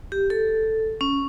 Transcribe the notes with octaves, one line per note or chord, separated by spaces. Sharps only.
G4
A4
C#4